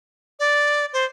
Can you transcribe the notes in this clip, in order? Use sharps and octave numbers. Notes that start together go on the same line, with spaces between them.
D5
C5